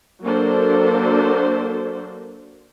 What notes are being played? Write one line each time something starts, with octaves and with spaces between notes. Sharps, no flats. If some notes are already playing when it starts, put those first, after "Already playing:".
F#3 A#3 D4 A4 A#4 C5